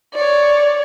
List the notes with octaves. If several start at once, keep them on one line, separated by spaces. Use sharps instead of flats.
C#5 D5